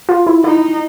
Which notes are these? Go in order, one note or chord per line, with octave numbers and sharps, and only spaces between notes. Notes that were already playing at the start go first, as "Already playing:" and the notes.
F4
E4
D#4 E4